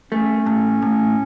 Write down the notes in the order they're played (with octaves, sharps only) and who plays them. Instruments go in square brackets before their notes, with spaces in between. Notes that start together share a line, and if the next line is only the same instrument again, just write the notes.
[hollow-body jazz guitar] A3 [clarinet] C#4
[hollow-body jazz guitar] A2
A2